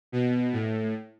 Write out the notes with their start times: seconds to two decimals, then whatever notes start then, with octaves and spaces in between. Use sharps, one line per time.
0.12 B2
0.53 A2